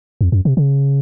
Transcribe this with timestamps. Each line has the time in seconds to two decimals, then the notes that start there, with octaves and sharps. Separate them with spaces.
0.21 F2
0.32 F#2
0.45 C3
0.57 C#3